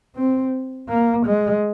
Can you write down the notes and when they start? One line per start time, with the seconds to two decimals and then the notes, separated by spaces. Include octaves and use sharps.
0.15 C4
0.89 A#3
1.26 G#3